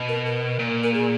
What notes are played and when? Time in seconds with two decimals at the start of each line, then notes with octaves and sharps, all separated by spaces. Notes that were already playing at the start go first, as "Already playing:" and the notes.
Already playing: B2
0.08 A#4
0.26 A#4
0.59 A#2
0.83 A#4
0.94 G#4